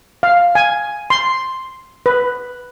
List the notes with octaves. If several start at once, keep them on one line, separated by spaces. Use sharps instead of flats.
F5
G#5
C6
B4